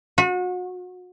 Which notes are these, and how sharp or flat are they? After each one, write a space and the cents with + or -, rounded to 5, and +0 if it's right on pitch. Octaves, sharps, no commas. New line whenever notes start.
F#4 -35